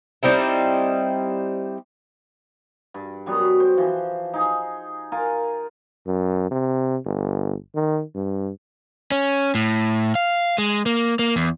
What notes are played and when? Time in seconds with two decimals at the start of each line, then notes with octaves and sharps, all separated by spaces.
0.23 G3 C4 D#4 E4
2.94 G2
3.26 F#2 F#3 G3 B3
3.60 C5
3.77 E3 F3
4.33 D#4 G#4
5.12 F4 A#4 G#5
6.06 F#2
6.51 C3
7.05 G1
7.75 D#3
8.15 G2
9.11 C#4
9.55 A2
10.15 F5
10.58 G#3
10.86 A#3
11.19 A#3
11.36 E2